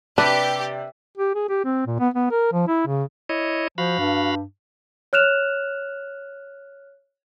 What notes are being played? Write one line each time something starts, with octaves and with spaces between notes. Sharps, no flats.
C3 D4 G4 B4 D5
G4
G#4
G4
C4
A#2
B3
B3
A#4
F3
E4
C#3
E4 C#5 D#5
F3 F#4 F5 B5
G2
C#5 F6 F#6 E7 F7